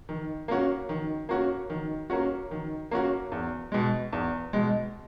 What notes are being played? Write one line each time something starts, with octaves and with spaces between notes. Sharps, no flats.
D#3
A#3 C#4 F#4
D#3
A#3 C#4 F#4
D#3
A#3 C#4 F#4
D#3
A#3 C#4 F#4
E2
B2 G#3
E2
B2 G#3